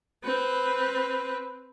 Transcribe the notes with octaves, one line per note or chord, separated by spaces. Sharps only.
C4 B4